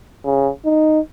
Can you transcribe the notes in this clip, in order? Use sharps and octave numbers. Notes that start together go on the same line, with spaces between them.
C#3
D#4